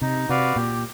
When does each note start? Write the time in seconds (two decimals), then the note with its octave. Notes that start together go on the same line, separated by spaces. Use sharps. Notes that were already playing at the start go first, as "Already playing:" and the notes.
0.01 C3 D#4
0.29 C3 F#4 B4 D5 F5
0.56 A#2 G4